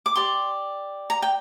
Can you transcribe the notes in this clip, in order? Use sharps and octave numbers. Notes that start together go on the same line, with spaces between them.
D6
G4 D5 C6
A#5
G5